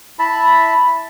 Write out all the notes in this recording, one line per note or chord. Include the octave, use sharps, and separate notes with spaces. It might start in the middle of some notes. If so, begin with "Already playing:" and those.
E4 E5 A5 B5